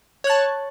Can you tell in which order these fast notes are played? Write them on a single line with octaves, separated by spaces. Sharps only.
C#5 F#6 A5